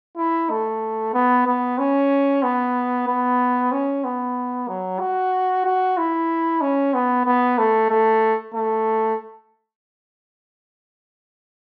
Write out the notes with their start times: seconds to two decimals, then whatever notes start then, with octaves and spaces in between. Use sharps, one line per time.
0.17 E4
0.50 A3
1.14 B3
1.46 B3
1.78 C#4
2.43 B3
3.07 B3
3.72 C#4
4.04 B3
4.68 F#3
5.00 F#4
5.65 F#4
5.98 E4
6.61 C#4
6.94 B3
7.26 B3
7.58 A3
7.90 A3
8.54 A3